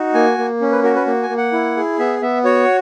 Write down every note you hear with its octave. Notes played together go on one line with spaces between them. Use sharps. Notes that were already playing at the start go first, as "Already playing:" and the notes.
Already playing: D#4 F#4
A#3 G#5
A#3
C#4
B4
F#4 A#4
B4
A#3
G#5
A#3
F#5
E4
G#4
B3 E5
B3 E5
F#4 C#5